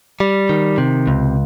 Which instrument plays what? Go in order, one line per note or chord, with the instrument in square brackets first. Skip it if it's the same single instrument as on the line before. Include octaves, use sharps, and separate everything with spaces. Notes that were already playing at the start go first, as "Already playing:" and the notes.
[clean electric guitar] G3
D#3
C3
C#2